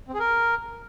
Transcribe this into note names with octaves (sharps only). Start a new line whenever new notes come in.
C4
G#4
A#4